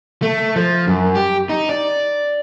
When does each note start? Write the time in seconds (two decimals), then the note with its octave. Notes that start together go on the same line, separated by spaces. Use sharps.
0.22 A3
0.56 F3
0.87 F#2
1.15 G4
1.49 D#4
1.69 D5